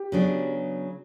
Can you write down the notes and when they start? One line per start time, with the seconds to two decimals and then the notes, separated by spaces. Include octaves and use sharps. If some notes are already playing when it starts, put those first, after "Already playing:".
Already playing: G4
0.12 C#3 F#3 B3 D4